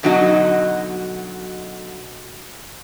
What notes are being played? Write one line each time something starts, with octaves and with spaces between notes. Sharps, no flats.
B2 D3 F#3 D#4 F#4 D#5